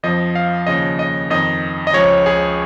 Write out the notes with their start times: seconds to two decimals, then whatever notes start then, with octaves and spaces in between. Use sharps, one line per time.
0.03 F2 F3 D#5
0.35 F5
0.66 D#2 C#3 F3 D#5
0.99 D#5
1.30 F2 D#3 D#5
1.87 D#5
1.93 C#2 C#3 F3 C#5
2.26 G#4